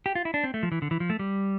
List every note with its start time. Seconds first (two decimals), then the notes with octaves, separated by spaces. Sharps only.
0.06 G4
0.15 F4
0.25 E4
0.34 D4
0.44 C4
0.54 A3
0.63 F3
0.72 E3
0.82 D3
0.91 E3
1.00 F3
1.10 A3
1.19 G3